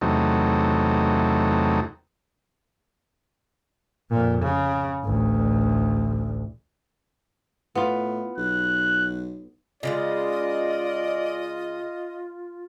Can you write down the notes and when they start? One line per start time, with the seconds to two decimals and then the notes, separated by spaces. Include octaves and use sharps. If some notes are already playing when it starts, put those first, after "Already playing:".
0.01 E2 C3 F#3 A3 D#4
4.10 F2 A#2
4.42 C#3
5.04 A1 D2
7.75 A2 B3 F4
8.38 B1 F#6
9.83 C#3 F3 G#3 F4 D5 D#5